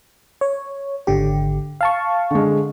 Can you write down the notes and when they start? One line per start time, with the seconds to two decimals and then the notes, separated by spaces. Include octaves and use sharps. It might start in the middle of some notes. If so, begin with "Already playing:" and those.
0.41 C#5
1.07 G#1 D3 G4
1.81 F5 A5 C#6
2.31 D3 G#3